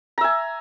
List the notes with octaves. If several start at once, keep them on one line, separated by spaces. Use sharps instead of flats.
E5 G#5 A#5